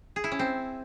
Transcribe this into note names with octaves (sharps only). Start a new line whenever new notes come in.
G#4
E4
C#4
C4